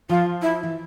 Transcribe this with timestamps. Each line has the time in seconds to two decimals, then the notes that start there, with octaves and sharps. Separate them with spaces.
0.09 F3 F4
0.42 E4
0.63 E3